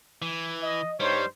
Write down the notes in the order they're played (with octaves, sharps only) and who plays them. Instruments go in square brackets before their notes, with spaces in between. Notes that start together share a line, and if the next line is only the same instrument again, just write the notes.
[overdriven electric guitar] E3
[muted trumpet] D#5
[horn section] G2 D#4 C#5 [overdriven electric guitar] G3 [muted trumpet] C5